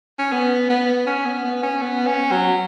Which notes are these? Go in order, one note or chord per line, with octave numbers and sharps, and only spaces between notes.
C#4
B3
B3
C#4
B3
B3
C#4
B3
C#4
F#3